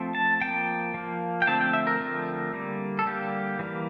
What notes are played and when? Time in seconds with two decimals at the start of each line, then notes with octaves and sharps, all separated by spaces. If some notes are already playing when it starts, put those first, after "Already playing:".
Already playing: F3 A3 C4
0.15 A5
0.41 F3 A#3 G5
0.94 F3 A#3
1.42 G5
1.47 D3 F3 A3 C4 A5
1.61 G5
1.73 E5
1.87 A#4
2.00 D3 F3 A3 C4
2.53 D3 G3 A#3
2.99 A4
3.05 D3 G3 A#3 G4
3.59 E3 G3 A#3